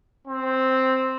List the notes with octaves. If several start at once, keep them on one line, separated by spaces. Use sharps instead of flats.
C4